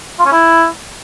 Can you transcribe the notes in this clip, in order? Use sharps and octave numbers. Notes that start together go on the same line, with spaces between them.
F4
C#4
E4